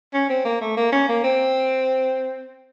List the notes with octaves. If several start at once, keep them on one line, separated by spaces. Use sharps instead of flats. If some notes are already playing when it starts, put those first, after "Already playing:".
C#4
C4
A#3
A3
A#3
C#4
A#3
C4